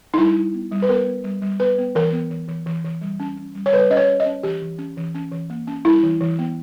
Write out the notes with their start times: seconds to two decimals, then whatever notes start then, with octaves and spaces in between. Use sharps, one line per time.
0.14 D#4
0.18 G3 E4
0.36 G3
0.54 B3
0.71 G3
0.82 B4
0.89 B3 A#4
1.06 B3
1.24 G3
1.42 G3
1.60 B3 B4
1.78 B3
1.95 E3 A#4
2.13 B3
2.30 E3
2.48 E3
2.66 E3
2.84 E3
3.01 G3
3.20 C#4
3.37 C#4
3.55 G3
3.66 C#5
3.73 G3 B4
3.90 C#4 D#5
3.97 C#5
4.08 C#4
4.20 D#5
4.26 C#4
4.43 E3 G4
4.62 E3
4.79 C#4
4.97 E3
5.14 C#4
5.32 E3
5.50 A#3
5.67 C#4
5.85 G3 E4
6.03 E3
6.21 E3
6.39 B3